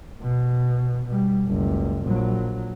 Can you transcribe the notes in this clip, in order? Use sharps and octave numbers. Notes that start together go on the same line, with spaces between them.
B2
B2 G3
F#1 C#2
A#1 F#3